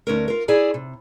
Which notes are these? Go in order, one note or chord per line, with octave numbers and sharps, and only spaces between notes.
D2 C#4 A#4
F4 A#4
E4 G#4 D5 G#5
C3